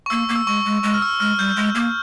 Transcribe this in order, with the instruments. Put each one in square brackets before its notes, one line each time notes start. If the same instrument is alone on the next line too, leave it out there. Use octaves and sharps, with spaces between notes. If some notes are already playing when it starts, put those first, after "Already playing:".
[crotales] C#6
[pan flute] A#3 [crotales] E6
[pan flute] A#3
[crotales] E6
[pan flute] G#3 [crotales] C#6
[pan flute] G#3
[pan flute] G#3 [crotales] C#6
[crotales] F6
E6
[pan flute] G#3 [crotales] F6
[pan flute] G3 [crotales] G6
[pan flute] G#3
A#3